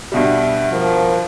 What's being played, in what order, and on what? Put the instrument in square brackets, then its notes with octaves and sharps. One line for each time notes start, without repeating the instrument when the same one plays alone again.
[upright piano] G2 B2 G3 [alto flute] E5
[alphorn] F3 [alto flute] A#4